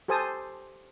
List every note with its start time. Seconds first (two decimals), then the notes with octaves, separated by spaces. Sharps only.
0.08 G4 A4 C5 G#5 A5 D#6